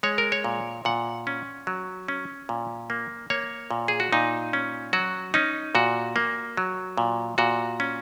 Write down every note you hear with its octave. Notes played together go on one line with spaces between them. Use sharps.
G#3 C#5
A#4
C#5
A#2
A#2 F#5
C#4
F#3
C#4
A#2
A#3
A#3 C#5
A#2
G#4
F#4
A#2 D#4
C#4
F#3 F#4
C#4 D#4
A#2 F#4
A#3
F#3
A#2
A#2 F#4
C#4